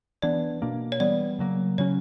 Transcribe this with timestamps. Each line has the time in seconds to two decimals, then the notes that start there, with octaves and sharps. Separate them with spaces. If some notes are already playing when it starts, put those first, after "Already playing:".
0.22 E3 B3 D4 D5
0.62 B2 A#3 D4
0.92 C#5
1.00 E3 G3 B3 D5
1.39 C#3 F#3 A#3
1.78 C#3 F#3 C#4 C#5